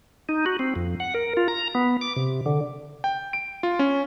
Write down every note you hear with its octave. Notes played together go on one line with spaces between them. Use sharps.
D#4
F#4
C4
F2
F#5
A#4
F4
A#5
B3
D6
C3
D3
G5
D7
F4
C#4